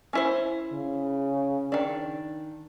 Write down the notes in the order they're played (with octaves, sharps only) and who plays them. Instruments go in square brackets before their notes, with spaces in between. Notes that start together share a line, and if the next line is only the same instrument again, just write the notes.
[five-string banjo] C#4 E4 C5
[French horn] C#3
[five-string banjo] D#3 D4